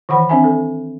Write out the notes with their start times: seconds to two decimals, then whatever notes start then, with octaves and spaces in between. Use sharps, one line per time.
0.09 D#3 E3 F#5 B5
0.29 C4 D4 E5 G#5
0.44 A4